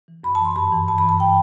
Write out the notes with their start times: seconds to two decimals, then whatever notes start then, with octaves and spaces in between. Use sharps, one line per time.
0.08 E3
0.24 F#2 B5
0.35 A5
0.41 E3 C6
0.56 G2 B5
0.72 E3
0.88 G2 A5
0.98 B5
1.04 E3
1.09 A5
1.20 G5